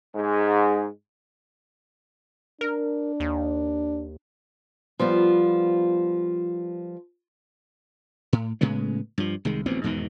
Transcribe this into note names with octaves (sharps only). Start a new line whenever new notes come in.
G#2 G#3
D4 A#4
D#2
F3 G3 B3 F4
A2
A2 C#3 G#3 B3
G2 F3
C2 D#3 G#3
A1 D2 B3 C4
E2 G#2 B2 D#3